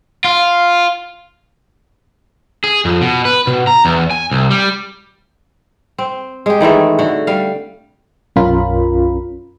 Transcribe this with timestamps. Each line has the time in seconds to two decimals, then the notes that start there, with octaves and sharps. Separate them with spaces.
0.24 F4 F5
2.64 G#4
2.85 F2
3.01 B2
3.25 B4
3.47 B2
3.67 A#5
3.85 E2
4.11 G#5
4.31 C2
4.50 G3
5.98 C4
6.46 G#3 G4
6.60 D#3 E3 G#3 A3
6.99 D3 F#4
7.27 G3 F5
8.36 B1 F#2 C#4 F4 A#4 B5